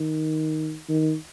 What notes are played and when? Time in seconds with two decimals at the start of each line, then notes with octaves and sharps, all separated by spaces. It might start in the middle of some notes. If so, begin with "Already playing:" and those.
Already playing: D#3
0.89 D#3